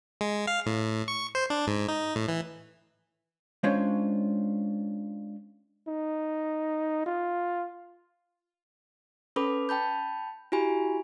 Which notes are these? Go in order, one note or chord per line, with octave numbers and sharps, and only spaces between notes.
G#3
F5
A2
C#6
C5
D4
G#2
D#4
A2
E3
G#3 C#4 D4 F4 C5 C#5
D#4
F4
C#4 A4 B4 B5 D6
G5 A5 B5 G6
E4 F#4 G4 G#5 B5